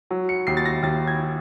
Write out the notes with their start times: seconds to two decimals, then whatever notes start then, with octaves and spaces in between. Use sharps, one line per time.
0.11 F#3
0.29 C#7
0.47 D#2 C7
0.57 A6
0.65 A#6
0.83 D#2 A6
1.07 G#6